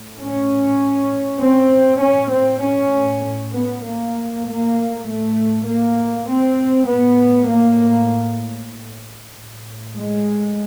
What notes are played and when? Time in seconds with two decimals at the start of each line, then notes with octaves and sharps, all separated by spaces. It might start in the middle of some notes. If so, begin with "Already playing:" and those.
Already playing: A2
0.20 C#4
1.42 C4
2.02 A2 C#4
2.32 C4
2.63 C#4
3.55 B3
3.85 A#3
4.46 A2 A#3
5.06 A3
5.67 A#3
6.28 C4
6.89 A2 B3
7.50 A#3
9.32 A2
9.94 G#3